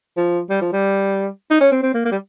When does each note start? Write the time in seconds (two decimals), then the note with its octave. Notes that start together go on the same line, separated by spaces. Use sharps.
0.17 F3
0.50 G3
0.61 F3
0.72 G3
1.50 D#4
1.61 C#4
1.72 C4
1.83 C4
1.94 A#3
2.05 A#3
2.12 G3